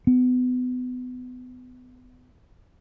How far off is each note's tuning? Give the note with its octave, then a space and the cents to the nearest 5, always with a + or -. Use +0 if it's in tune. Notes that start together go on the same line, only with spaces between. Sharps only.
B3 +30